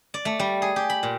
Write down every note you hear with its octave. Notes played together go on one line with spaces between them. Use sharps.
D5
A3
G3
G#4
G4
B5
A#2